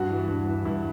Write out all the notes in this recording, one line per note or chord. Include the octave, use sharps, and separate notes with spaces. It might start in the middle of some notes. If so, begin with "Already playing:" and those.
Already playing: G2 F#4
E3
G2
E3
G2 E4